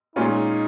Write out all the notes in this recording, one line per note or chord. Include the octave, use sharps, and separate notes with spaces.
A#2 G#3 C#4 D#4 F4